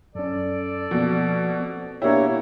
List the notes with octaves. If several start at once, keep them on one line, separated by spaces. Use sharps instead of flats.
F#2 C#4 A4 D5
B2 F3 A#3
C4
B2 A#3 D4 E4 G4 C#5 G5